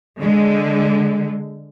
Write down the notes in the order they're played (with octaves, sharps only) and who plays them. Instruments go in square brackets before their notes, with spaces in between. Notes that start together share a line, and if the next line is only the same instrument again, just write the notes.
[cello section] D3 G#3